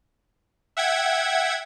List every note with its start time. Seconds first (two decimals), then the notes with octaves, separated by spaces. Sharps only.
0.77 E5 F#5 G5 G#6